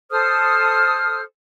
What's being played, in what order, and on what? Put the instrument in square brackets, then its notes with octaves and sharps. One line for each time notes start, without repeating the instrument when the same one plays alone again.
[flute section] A4 C5 D#6 F6